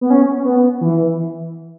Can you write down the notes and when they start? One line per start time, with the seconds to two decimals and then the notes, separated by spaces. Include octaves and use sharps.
0.01 B3
0.10 C#4
0.45 B3
0.81 E3